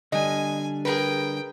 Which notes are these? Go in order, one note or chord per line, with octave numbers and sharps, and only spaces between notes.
D3 G3 D4 D#5 G#5
G#4 A#4 B4 G5